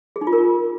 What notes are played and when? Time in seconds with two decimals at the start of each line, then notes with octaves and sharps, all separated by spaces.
0.16 G#4
0.21 D#4
0.27 F4
0.33 A#4